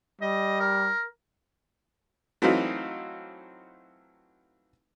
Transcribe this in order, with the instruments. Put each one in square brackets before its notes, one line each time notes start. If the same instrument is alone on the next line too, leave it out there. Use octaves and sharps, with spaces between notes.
[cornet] G3 [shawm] D#5
[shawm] A#4
[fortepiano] E3 F#3 A3 C4 D#4 F4